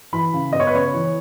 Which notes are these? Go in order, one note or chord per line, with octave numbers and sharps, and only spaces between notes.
E3 B5
C#3
B3 D#5
C#5
B4
C#3 C#5
E3